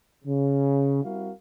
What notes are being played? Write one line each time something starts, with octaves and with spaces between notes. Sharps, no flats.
C#3
G3 C4 E4 F#4 A#4 F5